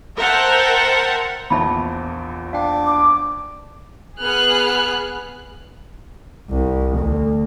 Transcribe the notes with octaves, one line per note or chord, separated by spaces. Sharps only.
A#4 C5 E5 F#5 G5 A5
A#1 E2 E5 A5 B5
D4 F5 G5
D6
B3 G#4 F6 F#6
C2
D2